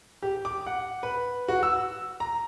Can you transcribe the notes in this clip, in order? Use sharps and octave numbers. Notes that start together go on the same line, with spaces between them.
G4
D6
F#5
B4
F#4
E6
A#5